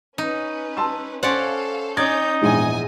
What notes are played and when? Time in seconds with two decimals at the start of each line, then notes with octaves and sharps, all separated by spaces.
0.18 C#4 D#4 B4
0.77 A5 C6 E6
1.23 C#4 A4 C5 D5 F5 F#5 C6
1.97 C#4 D#4 C#5 D5 G6 G#6
2.41 A#1 E2 G#2 D#5 G#5